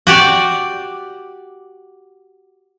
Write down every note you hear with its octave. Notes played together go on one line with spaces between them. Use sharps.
F#4 G4 D5